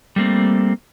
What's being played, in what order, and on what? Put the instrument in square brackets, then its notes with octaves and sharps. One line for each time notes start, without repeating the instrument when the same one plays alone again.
[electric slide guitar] G3 A3 A#3 C4